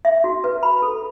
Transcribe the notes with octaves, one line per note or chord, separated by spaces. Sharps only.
E5
F#4
B4
B5
A4